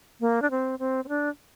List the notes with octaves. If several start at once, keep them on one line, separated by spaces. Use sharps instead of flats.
A#3
D4
C4
C4
C4
D4